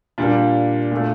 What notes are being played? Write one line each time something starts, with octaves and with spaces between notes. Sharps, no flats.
A#2 G3 A#3 D4
A#2 A3